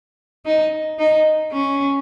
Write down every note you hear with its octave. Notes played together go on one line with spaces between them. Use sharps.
D#4
D#4
C#4